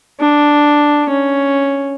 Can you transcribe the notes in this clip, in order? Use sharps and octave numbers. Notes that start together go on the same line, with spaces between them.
D4
C#4